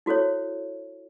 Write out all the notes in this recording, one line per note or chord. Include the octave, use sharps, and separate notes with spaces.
E4 F#4 A4 C5 C#5